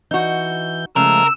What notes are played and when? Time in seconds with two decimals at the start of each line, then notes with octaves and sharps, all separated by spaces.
0.11 E3 D#4 F#4 G6
0.96 C#3 F3 G#3 A3 A#4 E6